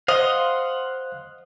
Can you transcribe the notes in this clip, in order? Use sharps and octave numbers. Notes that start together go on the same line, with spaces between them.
C5 D#5 F5 F#5 C6